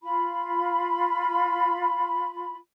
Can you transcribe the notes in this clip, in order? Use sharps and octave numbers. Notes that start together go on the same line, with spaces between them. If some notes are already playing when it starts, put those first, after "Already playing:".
F4 B5